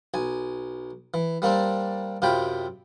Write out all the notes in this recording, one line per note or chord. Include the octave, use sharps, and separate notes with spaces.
B1 G#5
E3
G3 A#3 C4 D4
F#2 C3 F4 G5 B5